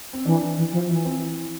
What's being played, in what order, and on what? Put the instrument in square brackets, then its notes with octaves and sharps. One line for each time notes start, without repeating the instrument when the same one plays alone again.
[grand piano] C4
[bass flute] E3 [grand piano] D4
[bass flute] E3 [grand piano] E4
[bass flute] F3 [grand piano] F4
[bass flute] E3 [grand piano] E4
[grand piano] C4
E4